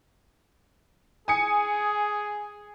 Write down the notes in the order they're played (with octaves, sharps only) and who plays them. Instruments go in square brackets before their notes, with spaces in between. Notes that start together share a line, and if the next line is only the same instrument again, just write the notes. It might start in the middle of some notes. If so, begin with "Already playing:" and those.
[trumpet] G#4 [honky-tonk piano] G#5 D#6 C#7